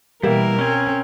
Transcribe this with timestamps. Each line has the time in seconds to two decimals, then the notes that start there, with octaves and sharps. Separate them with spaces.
0.23 B2 E3 G3 A#3 E4 G4 A#4
0.59 C4 C#4 G#5